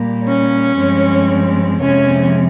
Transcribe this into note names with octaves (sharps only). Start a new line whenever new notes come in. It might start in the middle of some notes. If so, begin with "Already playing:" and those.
Already playing: A#2 G3 A#3
C#4 C#5
G2 F3 G#3 C4
F2 C3 F3 G#3 C#4 C#5